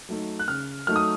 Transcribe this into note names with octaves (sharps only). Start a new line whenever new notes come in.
F#3 A3 D#4
F#6
C#3 F6
F#3 A3 D#4 F6
D#6